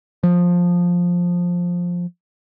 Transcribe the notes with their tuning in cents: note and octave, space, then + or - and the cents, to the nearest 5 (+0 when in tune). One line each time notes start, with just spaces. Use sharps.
F3 +10